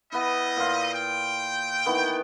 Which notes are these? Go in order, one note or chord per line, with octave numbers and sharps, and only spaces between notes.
G3 B3 E4 D#5
A#2 F4
G5
D#3 E3 B3